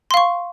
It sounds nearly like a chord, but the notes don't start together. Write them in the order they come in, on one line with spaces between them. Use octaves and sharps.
C6 F5 C#6